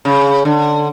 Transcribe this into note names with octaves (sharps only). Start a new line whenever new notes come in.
C#3
D3